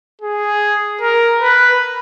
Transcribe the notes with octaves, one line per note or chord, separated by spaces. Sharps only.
G#4
A#4
B4